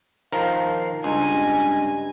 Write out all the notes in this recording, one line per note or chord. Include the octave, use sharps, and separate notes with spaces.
D#3 F3 A#4 F5
C#2 G2 D#5 G#5